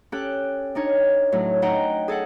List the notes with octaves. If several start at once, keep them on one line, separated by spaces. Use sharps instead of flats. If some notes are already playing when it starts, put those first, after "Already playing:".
C#4 G4 A4 G5 F#6
D4 D#4 C#5
A2 F#3
C#4 D#4 D#5 F#5 G5 A#5
G#4 A4 D#5 F#5